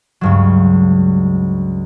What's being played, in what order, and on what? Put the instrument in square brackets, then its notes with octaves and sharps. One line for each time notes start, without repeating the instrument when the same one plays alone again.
[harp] C#2 G2 F#3